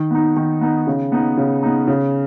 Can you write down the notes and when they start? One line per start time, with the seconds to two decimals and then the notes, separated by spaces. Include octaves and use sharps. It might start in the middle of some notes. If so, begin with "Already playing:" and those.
Already playing: D#3
0.11 B3 D#4
0.37 D#3
0.61 B3 D#4
0.87 C#3
1.12 B3 D#4
1.37 C#3
1.63 B3 D#4
1.88 C#3